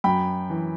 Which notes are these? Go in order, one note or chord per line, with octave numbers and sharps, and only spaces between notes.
F#2 G5 B5
E3